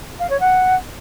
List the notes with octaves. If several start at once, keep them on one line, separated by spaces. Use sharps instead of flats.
F5
C#5
F#5